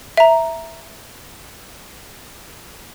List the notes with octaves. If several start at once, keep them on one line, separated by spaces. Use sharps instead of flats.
E5 A#5